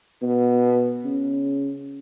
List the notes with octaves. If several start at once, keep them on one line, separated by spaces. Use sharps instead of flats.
B2
C#3